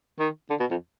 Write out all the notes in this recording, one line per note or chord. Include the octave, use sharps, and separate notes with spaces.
D#3
D3
B2
F2